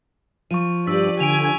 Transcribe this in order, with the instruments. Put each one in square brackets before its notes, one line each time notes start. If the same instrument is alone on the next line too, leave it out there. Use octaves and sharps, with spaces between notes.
[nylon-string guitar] F3 [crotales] C#6 D#7
[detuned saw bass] G2 [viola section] G4 D5 [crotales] E6 B6
[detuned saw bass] D3 [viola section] G#5 [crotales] D7 D#7 F7